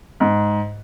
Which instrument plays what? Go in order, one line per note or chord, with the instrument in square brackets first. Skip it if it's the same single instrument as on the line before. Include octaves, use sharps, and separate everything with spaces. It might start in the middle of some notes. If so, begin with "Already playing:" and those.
[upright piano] G#2